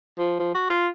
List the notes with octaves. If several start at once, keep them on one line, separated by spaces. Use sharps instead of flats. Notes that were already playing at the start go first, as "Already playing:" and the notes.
F3
F3
F#4
F4